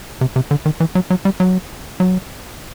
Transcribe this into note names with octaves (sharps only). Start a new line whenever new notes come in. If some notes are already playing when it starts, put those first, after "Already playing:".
C3
C3
D3
D#3
E3
F#3
F#3
G3
F#3
F#3